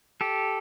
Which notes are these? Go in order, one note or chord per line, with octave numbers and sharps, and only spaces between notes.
G4 A4